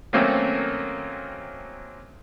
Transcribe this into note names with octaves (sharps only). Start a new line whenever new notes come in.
D#3 F#3 A3 A#3 C4 C#4